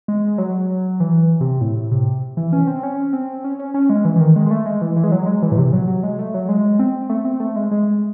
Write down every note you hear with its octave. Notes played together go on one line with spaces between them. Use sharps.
G#3
F#3
E3
C3
A2
C3
E3
C#4
C4
C#4
C4
C#4
C#4
C#4
G#3
E3
E3
D#3
G#3
G#3
A3
G#3
E3
E3
G#3
F#3
G#3
E3
A2
C3
F#3
F#3
G#3
A3
F#3
G#3
C4
A3
C4
A3
G#3
G#3